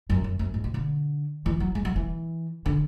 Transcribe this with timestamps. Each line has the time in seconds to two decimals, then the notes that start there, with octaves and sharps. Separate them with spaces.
0.10 F#2
0.24 F#2
0.39 F#2
0.54 G#2
0.64 B2
0.74 D3
1.46 E3
1.60 F#3
1.75 G#3
1.85 F#3
1.96 E3
2.66 D3